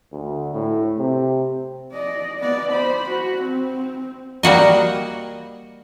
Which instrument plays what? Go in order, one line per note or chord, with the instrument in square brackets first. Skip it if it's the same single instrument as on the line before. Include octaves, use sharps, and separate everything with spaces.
[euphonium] D2
A2
C3
[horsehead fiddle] D5 D#5
B3 D5
C5 B5
F#4
C4
[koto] G3 A#3 F#4 D#5